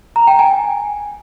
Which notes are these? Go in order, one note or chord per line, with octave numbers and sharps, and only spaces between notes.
A#5
G5
G#5